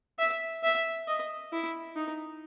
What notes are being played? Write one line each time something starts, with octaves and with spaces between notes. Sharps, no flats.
E5
E5
D#5
E4
D#4